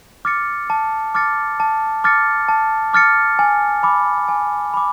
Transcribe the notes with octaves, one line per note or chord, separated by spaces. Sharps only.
D6 F6 A6 C#7
A5
D6 F6 A6 C#7
A5
D6 F6 A6 C#7
A5
D6 F6 A6 C#7
G#5
B5 D6
G#5
B5 D6